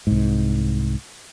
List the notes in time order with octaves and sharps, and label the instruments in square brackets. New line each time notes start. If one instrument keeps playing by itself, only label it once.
[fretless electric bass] C2 G#2